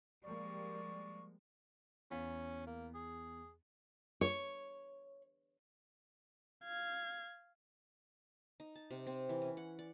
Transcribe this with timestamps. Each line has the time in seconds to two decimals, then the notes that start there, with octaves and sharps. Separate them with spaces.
0.24 F3 G3 G#3 A#3 D5 C#6
2.11 E2 C#4 F5 B5
2.67 A#3
2.95 G#4
4.21 C#5
6.64 F5 G#6
8.60 D#4
8.75 A5
8.90 C3
9.06 C4
9.29 E3
9.42 C#4
9.57 F#5
9.79 D5